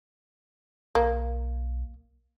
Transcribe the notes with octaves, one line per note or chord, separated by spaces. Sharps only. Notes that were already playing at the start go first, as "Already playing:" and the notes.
B1 A#3